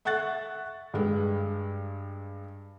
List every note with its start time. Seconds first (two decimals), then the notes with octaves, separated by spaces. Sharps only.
0.05 E5 F#5 C#6 F#6 A6
0.94 G2 G#3